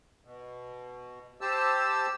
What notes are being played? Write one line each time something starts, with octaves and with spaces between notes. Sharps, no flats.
B2
G4 C5 A5 E6